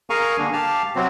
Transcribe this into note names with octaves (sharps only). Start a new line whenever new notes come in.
G#4 A#4 F5 G#5 A#5 C#6
D3 A#3 D4
G4 F5 A5 F6
C3 F#3 C4 F#4